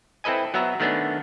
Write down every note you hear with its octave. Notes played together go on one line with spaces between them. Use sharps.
C4 E4 A4 B4 D#5 G#5
F#3 B3 E5 A#5
D#3 A3 B3 C#4 D4